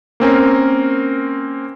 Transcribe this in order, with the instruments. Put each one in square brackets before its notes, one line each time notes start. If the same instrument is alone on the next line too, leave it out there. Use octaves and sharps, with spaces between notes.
[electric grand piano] A#3 C4 C#4 A#4